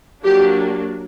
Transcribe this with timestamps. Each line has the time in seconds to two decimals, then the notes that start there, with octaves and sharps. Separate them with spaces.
0.23 F#3 A#3 D4 G4